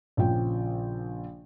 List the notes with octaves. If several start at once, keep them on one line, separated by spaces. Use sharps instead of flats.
A#1 C#3 F3 G5